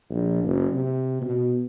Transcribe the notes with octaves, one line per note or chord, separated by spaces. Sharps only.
A#1
F#1
C3
B2